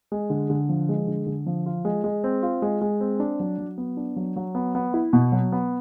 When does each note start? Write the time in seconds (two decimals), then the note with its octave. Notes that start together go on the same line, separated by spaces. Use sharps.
0.12 G#3
0.30 D3
0.50 D3
0.69 F3
0.89 G#3
1.08 D3
1.27 D3
1.46 F3
1.66 F4
1.85 G#3
2.04 G#3
2.24 C4
2.42 F4
2.62 G#3
2.81 G#3
3.00 C4
3.20 D4
3.40 F#3
3.58 F#3
3.78 B3
3.97 D4
4.16 F#3
4.36 F#3
4.55 B3
4.75 B3
4.94 E4
5.13 B2
5.32 F#3
5.52 B3